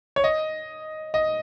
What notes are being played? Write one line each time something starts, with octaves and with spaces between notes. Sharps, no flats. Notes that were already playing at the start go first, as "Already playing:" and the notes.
C#5
D#5
D#5